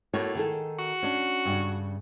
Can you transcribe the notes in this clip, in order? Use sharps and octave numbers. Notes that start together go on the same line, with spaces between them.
A2 A#3 F#4 C#5
D#3 G#4 A4
F#4
C#4 D4
G2 C#3 D4